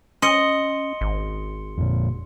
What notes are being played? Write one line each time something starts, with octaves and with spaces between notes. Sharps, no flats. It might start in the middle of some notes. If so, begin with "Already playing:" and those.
C#4 D#5 C6 C#7 G7
G#1
F2 A#2